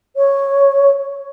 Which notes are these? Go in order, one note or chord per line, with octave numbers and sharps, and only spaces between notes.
C#5